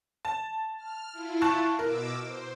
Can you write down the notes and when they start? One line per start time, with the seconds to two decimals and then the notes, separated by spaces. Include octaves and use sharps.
0.25 A5
0.77 F6
1.12 E4 F4
1.42 A5 C#6 F#6
1.79 B2 A#4 D6 E6
2.23 C5